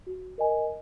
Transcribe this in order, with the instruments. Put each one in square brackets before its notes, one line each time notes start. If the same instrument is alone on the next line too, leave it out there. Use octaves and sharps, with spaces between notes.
[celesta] F#4
A#4 D#5 G#5